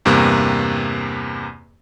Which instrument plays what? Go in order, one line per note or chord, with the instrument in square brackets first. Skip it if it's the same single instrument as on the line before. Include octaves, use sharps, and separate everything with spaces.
[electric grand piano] E2 G2 C3 A#3